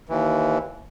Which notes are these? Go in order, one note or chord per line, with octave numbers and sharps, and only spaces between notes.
D#2 E3